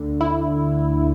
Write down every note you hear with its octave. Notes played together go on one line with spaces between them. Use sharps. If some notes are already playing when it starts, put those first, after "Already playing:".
Already playing: D2 D3
E4